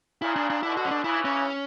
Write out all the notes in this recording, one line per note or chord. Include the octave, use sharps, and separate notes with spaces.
A#2 C#3 E4
D4
D4
B2 D3 E4
F#4
C#4
D4
C#3 E3 E4
C#4